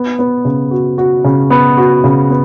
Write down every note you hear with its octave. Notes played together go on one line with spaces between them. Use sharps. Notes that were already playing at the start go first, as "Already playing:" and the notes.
Already playing: B3
B3
C#3
F#4
F#4
C#3
B3
F#4
C#3
B3